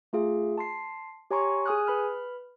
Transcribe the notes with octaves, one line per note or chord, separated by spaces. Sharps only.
A3 F4 G#4 F5
A5 C6 C7
G4 C#5 G#5 A#5 C6 C#6
G#4 G#5 D#6 F6 F#6
B4 B5 F6